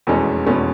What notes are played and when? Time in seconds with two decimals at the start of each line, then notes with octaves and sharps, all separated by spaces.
0.07 F1 E2 B2 G#3 C#4
0.46 F1 E2 B2 G#3 C#4